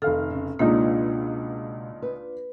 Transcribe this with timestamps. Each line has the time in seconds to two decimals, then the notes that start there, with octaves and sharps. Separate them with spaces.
0.02 F1 D#3 A4 F5 F6
0.30 C#3
0.59 C#2 B2 G#3 A#3 D4 D#4 F4
2.02 B4